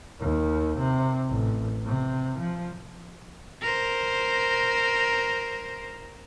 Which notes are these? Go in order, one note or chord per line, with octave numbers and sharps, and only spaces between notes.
D#2
C3
A1
C3
F3
A#4 C5